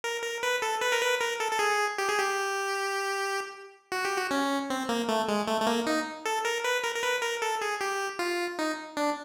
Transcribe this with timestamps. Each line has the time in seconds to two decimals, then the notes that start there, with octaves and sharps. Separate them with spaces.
0.04 A#4
0.23 A#4
0.43 B4
0.62 A4
0.81 B4
0.92 A#4
1.01 B4
1.21 A#4
1.40 A4
1.52 A4
1.59 G#4
1.98 G4
2.09 G#4
2.19 G4
3.92 F#4
4.05 G4
4.17 F#4
4.31 C#4
4.70 C4
4.89 A#3
5.09 A3
5.28 G#3
5.48 A3
5.61 A3
5.67 A#3
5.86 D#4
6.25 A4
6.45 A#4
6.64 B4
6.84 A#4
6.95 A#4
7.03 B4
7.22 A#4
7.42 A4
7.61 G#4
7.81 G4
8.19 F4
8.59 D#4
8.97 D4